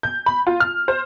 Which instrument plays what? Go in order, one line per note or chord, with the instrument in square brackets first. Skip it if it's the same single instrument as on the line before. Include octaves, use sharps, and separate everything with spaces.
[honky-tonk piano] G6
B5
F4
F6
C5